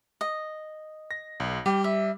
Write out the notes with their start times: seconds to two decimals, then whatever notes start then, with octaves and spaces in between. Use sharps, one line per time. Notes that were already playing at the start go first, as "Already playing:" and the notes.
0.21 D#5
1.11 A#6
1.40 B1
1.66 G3 G4
1.84 E5